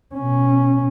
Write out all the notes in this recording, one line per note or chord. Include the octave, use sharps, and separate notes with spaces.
B2 C#4